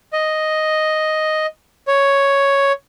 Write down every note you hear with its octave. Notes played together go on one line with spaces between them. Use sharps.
D#5
C#5